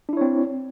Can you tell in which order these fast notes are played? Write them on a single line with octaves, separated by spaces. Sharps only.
D4 E4 C#5 C4